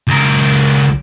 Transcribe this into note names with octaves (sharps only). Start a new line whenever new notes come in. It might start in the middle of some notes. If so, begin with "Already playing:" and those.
C#2 A#4